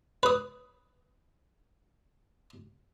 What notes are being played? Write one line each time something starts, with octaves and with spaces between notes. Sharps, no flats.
B4 D#6